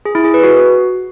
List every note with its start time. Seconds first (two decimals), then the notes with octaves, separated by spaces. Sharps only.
0.05 G#4
0.15 E4
0.24 G#4
0.34 B4
0.43 F#4